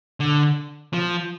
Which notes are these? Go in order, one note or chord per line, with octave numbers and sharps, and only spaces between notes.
D3
F3